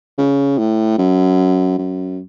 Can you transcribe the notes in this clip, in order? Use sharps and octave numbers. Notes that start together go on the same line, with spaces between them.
C#3
A2
F#2
F#2